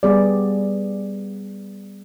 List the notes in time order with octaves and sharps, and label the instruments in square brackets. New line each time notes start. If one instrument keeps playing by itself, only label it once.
[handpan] G3 B3 G#4 D5